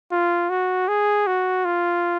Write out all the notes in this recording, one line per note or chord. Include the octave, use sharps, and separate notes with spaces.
F4
F#4
G#4
F#4
F4